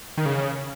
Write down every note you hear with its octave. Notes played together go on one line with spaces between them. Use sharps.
D#3
C#3